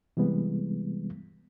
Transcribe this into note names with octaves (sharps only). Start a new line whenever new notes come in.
C3 E3 G3 G#3 B3